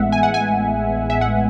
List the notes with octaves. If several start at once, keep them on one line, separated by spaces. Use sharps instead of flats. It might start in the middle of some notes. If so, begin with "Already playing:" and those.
Already playing: A1 A2 G#3 B3 E5 F#5
G#5
F#5
G#5
E5
F#5